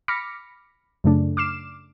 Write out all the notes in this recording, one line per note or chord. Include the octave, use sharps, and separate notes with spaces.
B5 D6 F6 A#6 B6 C#7
F#2 C#3 A3 D4
D6 F6 C7 E7